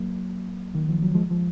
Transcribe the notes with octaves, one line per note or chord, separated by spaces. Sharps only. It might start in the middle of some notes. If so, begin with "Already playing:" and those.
Already playing: F#3 A#3
D#3
F3
F#3
F3 G#3
F3